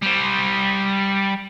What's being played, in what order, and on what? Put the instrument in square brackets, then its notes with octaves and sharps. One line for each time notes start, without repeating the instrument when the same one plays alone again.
[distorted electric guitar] G3 C5